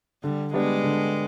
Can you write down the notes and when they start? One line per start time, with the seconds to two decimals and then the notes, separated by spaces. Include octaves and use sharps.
0.23 D3 G3
0.53 G3 G#3 B3 D4
0.84 D3